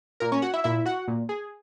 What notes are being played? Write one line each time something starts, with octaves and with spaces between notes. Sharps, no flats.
A#2 A#4
C#4 C#5
F#4 F#5
E4 E5
A#2 E4 E5
F#4 F#5
A#2
G#4